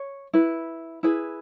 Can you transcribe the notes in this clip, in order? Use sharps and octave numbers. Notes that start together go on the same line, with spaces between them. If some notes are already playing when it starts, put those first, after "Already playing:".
Already playing: C#5
E4 B4
E4 G#4 B4